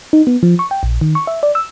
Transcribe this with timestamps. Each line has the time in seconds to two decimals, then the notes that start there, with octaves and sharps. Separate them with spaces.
0.13 D#4
0.27 B3
0.43 F3
0.59 C#6
0.71 G5
0.83 A#1
1.01 D#3
1.15 C#6
1.27 E5
1.43 D5
1.55 E6